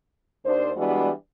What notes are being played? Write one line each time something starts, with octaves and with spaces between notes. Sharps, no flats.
D#2 D4 C5
E3 G3 G#3 B3 D4 F#4